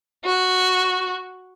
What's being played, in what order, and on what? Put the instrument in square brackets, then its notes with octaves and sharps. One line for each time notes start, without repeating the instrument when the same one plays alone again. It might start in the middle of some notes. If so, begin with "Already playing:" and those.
[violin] F#4